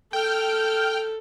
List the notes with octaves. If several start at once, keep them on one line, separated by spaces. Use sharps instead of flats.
A4 G5 F6